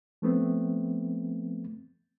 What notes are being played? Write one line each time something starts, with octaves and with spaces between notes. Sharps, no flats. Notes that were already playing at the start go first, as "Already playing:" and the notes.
F3 A3 B3 C4